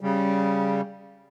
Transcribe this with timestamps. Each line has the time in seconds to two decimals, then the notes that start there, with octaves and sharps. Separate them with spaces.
0.01 C#3 G3